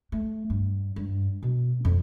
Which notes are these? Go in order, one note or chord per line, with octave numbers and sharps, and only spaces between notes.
A3
G2
G2
B2
F2